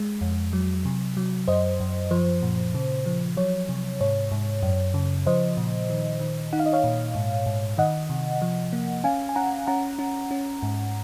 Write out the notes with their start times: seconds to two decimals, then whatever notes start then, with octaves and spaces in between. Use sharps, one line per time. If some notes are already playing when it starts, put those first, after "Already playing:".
Already playing: G#3
0.21 F2
0.53 F#3
0.85 C3
1.17 F#3
1.48 F#2 C5 D#5
1.80 F#2
2.11 F3 C5
2.42 A#2
2.75 C#3
3.06 F3
3.37 F#3 C#5
3.69 C3
4.01 G#2 C#5
4.32 G#2
4.63 F#2
4.94 C#3
5.26 F3 C5 D#5
5.57 A#2
5.90 D#3
6.20 D#3
6.53 D#4 F#5
6.59 F5
6.66 D#5
6.73 C#5 F5
6.84 A#2
7.15 G#2
7.46 G#2
7.78 D#3 D#5 F#5
8.10 C3
8.42 F3
8.73 A#3
9.04 C#4 F5 G#5
9.29 G#5
9.36 C#4 F#5 A#5
9.67 C#4 F#5 A#5
9.99 C#4
10.31 C#4
10.63 G#2